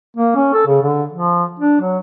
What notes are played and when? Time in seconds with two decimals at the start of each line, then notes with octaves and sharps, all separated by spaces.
0.16 A#3
0.36 C#4
0.54 A4
0.66 C#3
0.82 D3
1.13 F3
1.60 D4
1.81 F#3